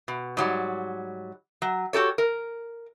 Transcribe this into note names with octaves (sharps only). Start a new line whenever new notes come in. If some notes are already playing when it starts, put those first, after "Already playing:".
B2
G#2 F#3 G3
F#3
F#4 G4 A4 C#5
A#4